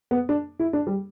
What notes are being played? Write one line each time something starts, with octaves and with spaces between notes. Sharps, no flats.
B3
D4
E4
D4
G3